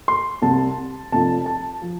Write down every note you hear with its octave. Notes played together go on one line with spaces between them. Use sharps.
C6
C2 C3 G3 A5
F1 F2 F3 A5
A5
F3